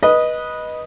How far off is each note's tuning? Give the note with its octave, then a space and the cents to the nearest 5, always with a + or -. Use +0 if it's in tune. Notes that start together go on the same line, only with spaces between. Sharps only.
B4 -15 D#5 +0